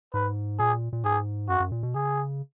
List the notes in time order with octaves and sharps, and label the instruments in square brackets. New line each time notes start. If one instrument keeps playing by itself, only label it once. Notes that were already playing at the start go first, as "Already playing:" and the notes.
[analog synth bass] G#2 [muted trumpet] B4
[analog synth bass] A#2 [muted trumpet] G#4
[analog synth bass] A#2
[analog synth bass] G#2 [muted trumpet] G#4
[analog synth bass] F#2 [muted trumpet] F#4
[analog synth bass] F#2
A#2
B2
[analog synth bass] C#3 [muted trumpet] G#4